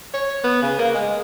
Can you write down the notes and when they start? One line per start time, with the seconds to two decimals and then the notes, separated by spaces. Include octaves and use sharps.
0.14 C#5
0.44 B3
0.62 C#3
0.79 A#3
0.94 G#3